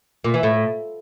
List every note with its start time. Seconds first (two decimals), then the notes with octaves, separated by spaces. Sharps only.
0.24 A#2
0.34 E3
0.43 A2